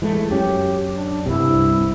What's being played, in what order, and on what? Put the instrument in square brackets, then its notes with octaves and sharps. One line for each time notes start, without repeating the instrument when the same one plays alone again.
[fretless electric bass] E3 G#3 A3
[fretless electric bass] F#2 C#4 [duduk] G4
[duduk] D4
[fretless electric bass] C2 G2 C3 [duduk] E4